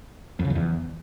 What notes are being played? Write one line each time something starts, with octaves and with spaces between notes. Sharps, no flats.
F2
C#3
F2
E2